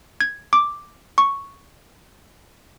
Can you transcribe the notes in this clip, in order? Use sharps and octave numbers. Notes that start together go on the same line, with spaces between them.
G#6
D6
C#6